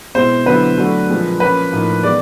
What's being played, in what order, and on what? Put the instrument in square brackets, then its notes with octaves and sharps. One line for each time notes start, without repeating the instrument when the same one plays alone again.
[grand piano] B2 G#3 C4 E4 [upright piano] C5
[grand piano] D3 F#3 B3 E4 G4 [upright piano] B4
[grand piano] F#3 A3 D4 F#4
A#2 F3 G#3 C4
[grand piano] F3 A#3 C#4 [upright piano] B4
[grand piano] A2 F3 A#3 D#4
[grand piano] E3 G#3 B3 [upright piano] D5